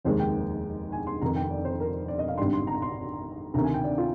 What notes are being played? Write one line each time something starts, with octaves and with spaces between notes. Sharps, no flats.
F1 D#2 D#3 G#3 C5
G5
G#5
C6
F1 F2 D#3 A#5
G5
D5
C5
A#4
D5
D#5
F5
G#1 G2 D3 G3 C6
C6
A#5
C6
D2 C3 D#3 A#5
G#5
G5
D5
F4